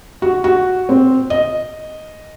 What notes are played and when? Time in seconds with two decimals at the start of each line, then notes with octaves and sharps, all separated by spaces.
0.22 F#4
0.44 F#4
0.89 C4
1.30 D#5